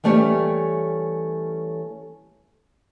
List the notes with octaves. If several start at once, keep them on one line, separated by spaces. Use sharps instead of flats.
E3 G3 A3 C#4 G4 C#5